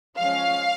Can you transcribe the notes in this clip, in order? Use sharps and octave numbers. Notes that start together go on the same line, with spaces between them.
F3 G#3 C#4 F5